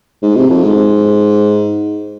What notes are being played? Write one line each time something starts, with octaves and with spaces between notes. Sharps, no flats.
G#2
C3
F2
G#2